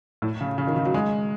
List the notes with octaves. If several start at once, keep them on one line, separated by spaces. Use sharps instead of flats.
A2
C#3
C#3
D#3
C#3
F#3
G#3